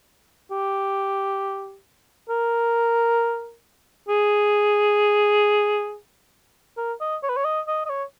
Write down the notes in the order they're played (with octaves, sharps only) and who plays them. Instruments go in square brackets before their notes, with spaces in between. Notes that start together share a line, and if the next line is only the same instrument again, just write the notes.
[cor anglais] G4
A#4
G#4
A#4
D#5
C#5
B4
C#5
D#5
D#5
D#5
C#5